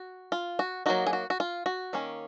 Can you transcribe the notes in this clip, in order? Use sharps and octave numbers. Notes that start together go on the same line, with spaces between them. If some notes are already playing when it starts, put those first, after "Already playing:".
Already playing: F#4
F4
F#4
F#3 A#3 D#4 F#4
G#4
F#4
F#4
F4
F#4
D#3 A#3 C#4